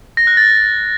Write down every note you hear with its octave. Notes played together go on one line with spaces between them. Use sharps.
A#6
F#6
A6